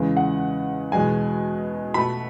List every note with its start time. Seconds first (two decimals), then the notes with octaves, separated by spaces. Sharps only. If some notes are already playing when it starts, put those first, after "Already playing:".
Already playing: E2 C#3 E3 G#3
0.17 F#5
0.92 E2 B2 G#3 G#5
1.94 B2 A3 B5